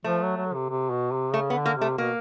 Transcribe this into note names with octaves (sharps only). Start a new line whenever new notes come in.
F3 A3
F#3
F#3
C3
C3
B2
C3
C#3 A3
B3
D3
A#3
C3 A3
B2 A#3